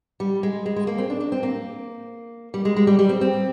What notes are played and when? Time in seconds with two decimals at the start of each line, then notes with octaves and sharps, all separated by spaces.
0.20 G3
0.43 G#3
0.66 G#3
0.76 G#3
0.87 A#3
0.98 C4
1.10 D4
1.20 D4
1.32 C4
1.43 A#3
2.54 G3
2.65 G#3
2.77 G#3
2.87 G3
2.99 G3
3.09 C4
3.21 C4